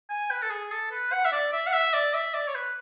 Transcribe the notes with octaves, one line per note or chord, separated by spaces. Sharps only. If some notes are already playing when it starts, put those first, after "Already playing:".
G#5
B4
A4
G#4
A4
B4
F#5
E5
D5
E5
F#5
E5
D5
E5
D5
C#5
B4